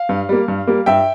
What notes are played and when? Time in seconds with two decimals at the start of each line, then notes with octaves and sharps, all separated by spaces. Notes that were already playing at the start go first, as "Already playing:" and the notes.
Already playing: F5
0.09 G2
0.29 G3 A#3
0.48 G2
0.67 G3 A#3
0.86 G2 E5 G5